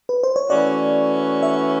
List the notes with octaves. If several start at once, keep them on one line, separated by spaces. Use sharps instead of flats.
B4
C5
C#5
E3 A3 C#4 F#4 D5
E5